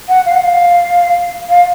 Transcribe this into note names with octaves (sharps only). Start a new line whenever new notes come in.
F#5
F5
F#5
F5
F5